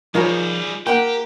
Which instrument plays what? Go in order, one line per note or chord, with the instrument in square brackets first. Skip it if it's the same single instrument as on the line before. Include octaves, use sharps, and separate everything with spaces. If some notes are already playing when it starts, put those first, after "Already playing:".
[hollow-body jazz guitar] F3 A#4 C#5 [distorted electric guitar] G3 G#4 [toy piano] D#4 F4 C5
[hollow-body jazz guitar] A#3 F#5 G5 [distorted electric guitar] G4 [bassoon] A#4